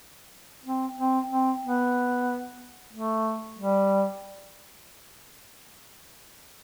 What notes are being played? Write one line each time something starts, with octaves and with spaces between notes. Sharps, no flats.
C4
C4
C4
B3
A3
G3